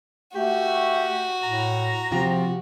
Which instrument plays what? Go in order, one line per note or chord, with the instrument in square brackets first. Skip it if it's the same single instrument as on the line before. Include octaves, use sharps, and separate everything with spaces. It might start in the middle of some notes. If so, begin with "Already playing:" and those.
[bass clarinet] A3 [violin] F#4 [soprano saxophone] G4
[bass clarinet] A2 [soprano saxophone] A#5
[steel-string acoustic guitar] C3 F4 G4 [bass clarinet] F3